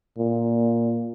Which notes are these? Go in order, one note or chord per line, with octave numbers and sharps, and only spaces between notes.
A#2